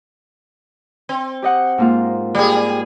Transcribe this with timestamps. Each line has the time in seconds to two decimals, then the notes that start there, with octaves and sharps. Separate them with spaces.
1.09 C4
1.42 G4 D#5 F#5
1.78 G#2 A#3 F4
2.35 G3 G#4